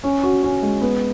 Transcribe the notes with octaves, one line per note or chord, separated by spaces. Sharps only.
C#4
F#4
C#4
G#3
B3